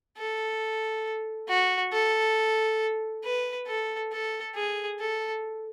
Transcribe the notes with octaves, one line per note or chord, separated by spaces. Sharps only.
A4
F#4
A4
B4
A4
A4
G#4
A4